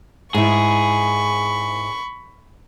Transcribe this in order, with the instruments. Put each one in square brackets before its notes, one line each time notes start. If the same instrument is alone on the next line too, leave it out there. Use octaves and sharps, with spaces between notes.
[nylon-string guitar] G#2 E4 [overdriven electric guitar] G#4 [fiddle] B5 C#6